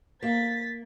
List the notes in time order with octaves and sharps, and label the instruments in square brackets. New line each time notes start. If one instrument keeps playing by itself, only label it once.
[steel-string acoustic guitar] A#3 [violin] A6 B6